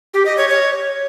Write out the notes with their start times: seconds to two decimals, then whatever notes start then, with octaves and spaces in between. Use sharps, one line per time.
0.14 G4
0.26 D#5
0.37 C#5
0.49 C#5